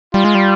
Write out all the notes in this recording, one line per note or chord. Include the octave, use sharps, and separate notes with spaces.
G3 F4
G#3
G3